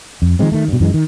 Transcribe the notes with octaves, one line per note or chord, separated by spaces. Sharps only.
F2
D#3 F3 G#3 C4
D#3 A3
G2 B2
F#2 E3 G3 G#3
D#3